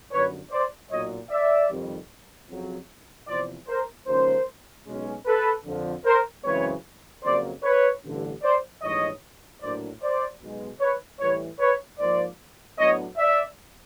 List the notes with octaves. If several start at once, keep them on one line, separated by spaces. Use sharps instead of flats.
G1 F#2 D3 B4 C#5
C5 D5
B1 A#2 F#3 C#5 D#5
D5 E5
F2 C3 D#3 G3
F2 C#3 F#3
E2 C3 F3 C5 D5
A#4 C5
D#2 C#3 F3 G#3 C#4 A#4 C5
B1 B2 G#3 C#4
A4 B4
F2 D3 F3
A#4 C5
F#2 C#3 E3 G#3 C4 B4 C#5
F2 C#3 F#3 A#3 C5 D5
B4 C#5
A1 G2 D3
C5 D5
A#1 G#2 E3 G3 C#5 D#5
A#1 A2 F#3 A#3 D4 C5 D5
C5 D5
B1 B2 G#3
B4 C#5
A2 E3 G3 B4 C#5
B4 C#5
G#2 F3 A#3 C5 D5
A2 F#3 B3 D4 C#5 D#5
D5 E5